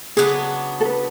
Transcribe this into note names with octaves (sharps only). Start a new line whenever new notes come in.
C#3 F#3 B3 D4 G#4
A4
B4